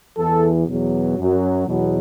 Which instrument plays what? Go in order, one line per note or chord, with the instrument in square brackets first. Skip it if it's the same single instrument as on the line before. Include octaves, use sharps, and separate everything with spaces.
[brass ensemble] E2 E3 A4
E2 B2 F#3
F#2 F#3
E2 B2 F#3